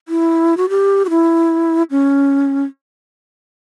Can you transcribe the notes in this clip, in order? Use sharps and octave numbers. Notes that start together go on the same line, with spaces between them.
E4
F#4
G4
F#4
E4
C#4